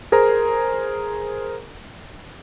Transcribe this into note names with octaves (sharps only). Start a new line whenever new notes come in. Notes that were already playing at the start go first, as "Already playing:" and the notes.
G#4 A#4 C5 A#5